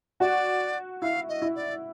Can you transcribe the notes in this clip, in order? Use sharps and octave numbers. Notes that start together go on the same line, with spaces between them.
F#4 D5
E4 F5
D#5
E4
D5